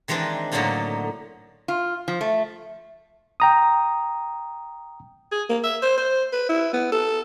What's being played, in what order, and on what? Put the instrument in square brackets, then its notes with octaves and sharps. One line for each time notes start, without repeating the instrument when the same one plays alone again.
[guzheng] D#3 E3 G#3 C4 D4
A2 D3 F#3 A#3 D#4 F4
[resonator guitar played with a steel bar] F4
F3
A3
[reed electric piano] G5 A#5 D#6
[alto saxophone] G#4
A#3
E5
C5
C5
B4
E4
B3
A4